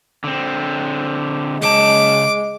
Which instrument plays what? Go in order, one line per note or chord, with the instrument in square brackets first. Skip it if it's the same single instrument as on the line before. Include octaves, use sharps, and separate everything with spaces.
[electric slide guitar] D3 C4
[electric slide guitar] C#3 A5 [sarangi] G#3 [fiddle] D6